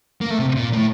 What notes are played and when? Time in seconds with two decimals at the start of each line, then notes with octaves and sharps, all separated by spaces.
0.21 A#3
0.30 A3
0.39 C3
0.56 A#2
0.73 A2